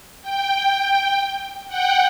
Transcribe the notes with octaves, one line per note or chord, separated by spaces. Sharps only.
G5
F#5 G5